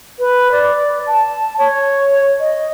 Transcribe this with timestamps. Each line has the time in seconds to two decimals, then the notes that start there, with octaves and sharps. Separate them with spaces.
0.19 B4
0.52 D5
1.07 A5
1.58 C#5
2.40 D#5